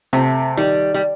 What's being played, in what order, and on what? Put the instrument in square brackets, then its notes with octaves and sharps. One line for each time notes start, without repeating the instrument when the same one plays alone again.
[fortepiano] C3 [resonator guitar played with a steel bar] A3
[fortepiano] D#3 [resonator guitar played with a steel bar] G3
[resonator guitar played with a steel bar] G3